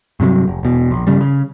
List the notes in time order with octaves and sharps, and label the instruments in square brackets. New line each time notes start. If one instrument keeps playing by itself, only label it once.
[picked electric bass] G2 C3 D#3 F#3
F1
E1 B2
A#1
G2 C#3 G3
C#3